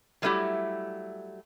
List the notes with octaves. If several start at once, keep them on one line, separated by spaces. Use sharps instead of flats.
F#3 G3 A3 C4 E4 G4